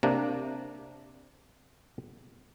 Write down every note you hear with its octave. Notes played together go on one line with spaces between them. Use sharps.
C3 A#3 D4